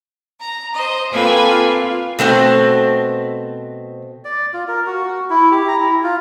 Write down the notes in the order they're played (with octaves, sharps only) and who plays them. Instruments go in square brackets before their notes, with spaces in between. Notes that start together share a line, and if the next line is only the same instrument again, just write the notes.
[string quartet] A#5
C5 D#5
A#3 C4 F4 A4 B4 G#5
F4
[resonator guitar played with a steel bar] B2 A3 C4 F#4
[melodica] D5
F4
A#4
F#4
F#4
E4
G4
A#5
E4
F4